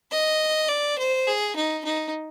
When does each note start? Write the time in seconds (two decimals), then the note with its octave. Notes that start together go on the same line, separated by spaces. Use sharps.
0.11 D#5
0.69 D5
0.98 C5
1.27 G#4
1.56 D#4
1.85 D#4